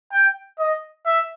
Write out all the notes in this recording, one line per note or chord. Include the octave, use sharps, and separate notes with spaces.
G5
D#5
E5